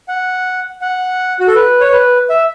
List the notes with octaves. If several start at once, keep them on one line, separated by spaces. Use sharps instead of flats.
F#5
F#5
F#4
A4
B4
C#5
B4
E5